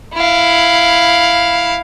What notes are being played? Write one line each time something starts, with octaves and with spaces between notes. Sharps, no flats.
E4 F5